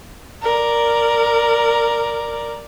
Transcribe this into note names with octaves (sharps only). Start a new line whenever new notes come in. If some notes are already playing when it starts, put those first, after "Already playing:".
A#4 D5